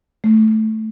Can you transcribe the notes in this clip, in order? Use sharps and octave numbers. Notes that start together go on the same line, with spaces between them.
A3